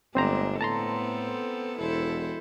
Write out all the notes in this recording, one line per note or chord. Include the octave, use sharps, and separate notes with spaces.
G1 G#3 A3 C4 D4 C5 A#5
A2 B3 C4 A4 A5 A#5 C6
E1 E4 A4 C5